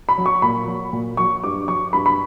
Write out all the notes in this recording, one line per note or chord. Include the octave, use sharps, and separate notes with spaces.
B5
F#3
C#6
A#2 B5
F#3
A#2
F#3 C#6
G2 D6
F#3 C#6
G2 B5
B5